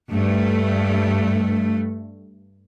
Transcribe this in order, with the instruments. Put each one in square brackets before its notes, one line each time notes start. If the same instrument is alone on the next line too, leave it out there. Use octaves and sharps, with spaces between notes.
[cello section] G2 A3